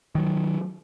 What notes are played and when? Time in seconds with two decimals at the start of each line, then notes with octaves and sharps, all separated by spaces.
0.15 D#3 F#3